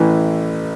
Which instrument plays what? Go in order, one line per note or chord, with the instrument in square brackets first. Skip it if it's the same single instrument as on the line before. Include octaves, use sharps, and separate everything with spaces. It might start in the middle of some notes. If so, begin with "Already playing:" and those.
Already playing: [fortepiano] A1 A2 E3